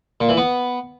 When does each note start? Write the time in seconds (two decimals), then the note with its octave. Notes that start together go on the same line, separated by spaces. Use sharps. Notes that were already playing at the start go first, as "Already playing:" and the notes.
0.21 A#2
0.29 E3
0.37 B3